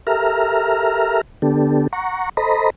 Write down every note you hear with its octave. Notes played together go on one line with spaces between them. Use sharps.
G4 A4 A#4 E5 A#5 F6
D3 B3 D4 G4 A4
F#5 A#5 C#6
A4 C5 D#5 A#5 B5